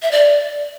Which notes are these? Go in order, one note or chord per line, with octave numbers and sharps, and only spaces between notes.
E5
D5